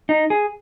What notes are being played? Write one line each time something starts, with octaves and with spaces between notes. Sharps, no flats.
D#4
G#4